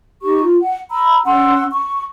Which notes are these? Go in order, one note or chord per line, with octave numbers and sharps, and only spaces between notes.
D#4 G4 C#6
F4
F#5
A#5 B5 E6
C#4 F#5 C6 E6
C#6